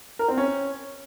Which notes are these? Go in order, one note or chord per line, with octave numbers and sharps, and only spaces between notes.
A#4
C4
C#4